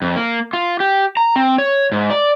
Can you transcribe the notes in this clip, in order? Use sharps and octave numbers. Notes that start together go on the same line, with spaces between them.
F2
A#3
F4
G4
A#5
C4
C#5
G#2
D5